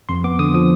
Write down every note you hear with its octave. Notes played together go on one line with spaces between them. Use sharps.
F2 C6
B3 D6
D3 D#6
F3 D#6